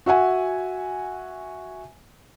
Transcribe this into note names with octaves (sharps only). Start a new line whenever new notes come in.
F#4 E5 F#5 G#5